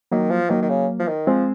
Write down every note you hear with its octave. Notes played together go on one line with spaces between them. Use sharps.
D#3 F#3 A#3
F3
D#3 F#3 A#3
D#3
C#3
F3
D#3
F3 G#3 C4